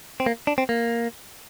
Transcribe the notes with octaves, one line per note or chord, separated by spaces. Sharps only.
C4
A#3
D4
C4
A#3